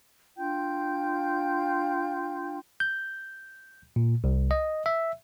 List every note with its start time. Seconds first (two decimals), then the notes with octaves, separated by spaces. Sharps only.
0.38 D4 F4 G5 G6
2.80 G6
3.96 A#2
4.24 C2
4.51 D#5
4.86 E5